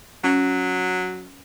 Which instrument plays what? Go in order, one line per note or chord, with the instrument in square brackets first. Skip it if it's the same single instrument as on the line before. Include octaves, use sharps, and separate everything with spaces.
[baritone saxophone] F#3 [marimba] C#4